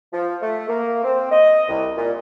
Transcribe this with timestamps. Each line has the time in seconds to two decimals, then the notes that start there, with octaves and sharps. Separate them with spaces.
0.13 F3
0.41 A3
0.68 A#3
1.03 C4
1.31 D#5
1.68 C2
1.97 A#2